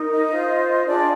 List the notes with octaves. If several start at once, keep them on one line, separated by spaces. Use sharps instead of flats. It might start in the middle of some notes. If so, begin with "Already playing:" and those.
Already playing: D#4 A#4
D#5
F4 C5
D4 F4 G#4 D5